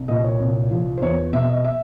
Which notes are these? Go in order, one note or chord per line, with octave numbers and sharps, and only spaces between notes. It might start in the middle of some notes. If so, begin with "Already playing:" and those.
Already playing: C2
A#2 D#5
C#5
C2
F3
C5
E2 C#5
B2 E5
D#5
E5